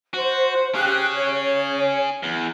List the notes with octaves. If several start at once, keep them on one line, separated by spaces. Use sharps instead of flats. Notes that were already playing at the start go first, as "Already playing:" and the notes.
F#4 C5
C#4 G4 G#4 F#6
C#5
E2